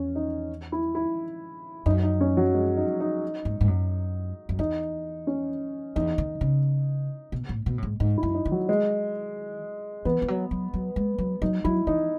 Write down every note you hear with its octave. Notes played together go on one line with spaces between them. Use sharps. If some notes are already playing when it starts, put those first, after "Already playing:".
Already playing: E2 C#4
D#4
E4
E4
F#2 D#4
D#4
C#4
F#3
G#3
D#4
D#4
G#2
G#2
F#2
F#2
E2 D#4
C#4
E2 D#4
D#3
C#3
B2
A2
B2
A2
G#2
G#2 D#4
E4
F#2
D#4
D#3
F#3
G#3
E3 B3
E3
F#3
F#3
F#3
G#3
F#3
F#3 D#4
F#3 E4
E3 D#4